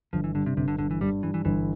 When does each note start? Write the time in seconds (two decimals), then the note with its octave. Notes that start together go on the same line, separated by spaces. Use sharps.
0.13 G1 F3
0.24 E3
0.35 G2 D3
0.46 C3
0.57 G1 C3
0.68 D3
0.79 G1 D3
0.91 E3
1.01 G2 G3
1.23 G2 E3
1.34 E3
1.45 G1 E3